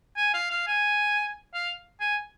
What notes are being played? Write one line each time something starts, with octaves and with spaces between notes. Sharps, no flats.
G#5
F5
F5
G#5
F5
G#5